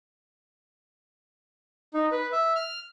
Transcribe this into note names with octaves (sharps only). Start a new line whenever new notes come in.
D#4
B4
E5
F6